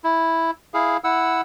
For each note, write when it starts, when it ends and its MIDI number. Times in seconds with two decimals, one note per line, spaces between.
0.04 0.51 64
0.74 0.97 64
0.74 0.97 68
0.74 0.97 77
1.04 1.41 64
1.04 1.41 78
1.04 1.41 88